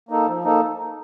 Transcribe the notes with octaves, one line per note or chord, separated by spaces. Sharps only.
A#3 D#4 A4
F3
A#3 D#4 A4